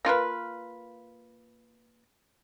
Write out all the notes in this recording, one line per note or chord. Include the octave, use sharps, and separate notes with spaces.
A#3 F4 A#4 B4